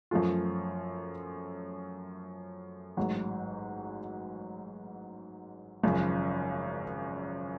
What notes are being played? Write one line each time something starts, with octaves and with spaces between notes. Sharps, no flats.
F#2 F3 A3 F4
A1 G#2 F#3
G#1 F#2 C#3 F3